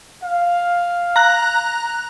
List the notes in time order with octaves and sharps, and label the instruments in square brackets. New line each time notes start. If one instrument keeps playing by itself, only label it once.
[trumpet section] F5
[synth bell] A#5 F#6